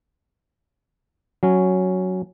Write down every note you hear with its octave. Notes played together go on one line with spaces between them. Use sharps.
F#3 C#4